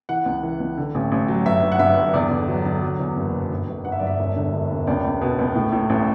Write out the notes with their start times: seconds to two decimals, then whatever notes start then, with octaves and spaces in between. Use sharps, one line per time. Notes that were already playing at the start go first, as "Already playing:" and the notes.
0.09 E3 F#5
0.26 C#2
0.43 E3
0.60 C#2
0.77 D3
0.95 A1
1.12 A1
1.28 F#3
1.46 G1 E5
1.63 G1
1.72 F#5
1.79 G2 E5
1.97 G1
2.14 E2 D5
2.31 D3
2.48 F#3
2.65 D3
2.82 F#3
2.99 E2
3.17 F#1
3.34 B2
3.51 G1
3.68 G1
3.85 G1 F#5
3.92 E5
3.99 G1 D5
4.07 E5
4.19 E1
4.36 D3
4.53 E1
4.70 E1
4.87 C#2 D5
5.05 C#2
5.21 B2
5.39 C#2
5.55 A2
5.72 A2
5.90 A1